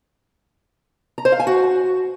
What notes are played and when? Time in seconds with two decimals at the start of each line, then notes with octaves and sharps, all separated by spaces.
1.18 A#5
1.25 C5
1.32 F5
1.40 G#5
1.47 F#4